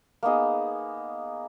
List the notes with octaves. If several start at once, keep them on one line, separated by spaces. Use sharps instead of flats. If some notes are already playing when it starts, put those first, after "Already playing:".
A#3 B3 D#4 G#4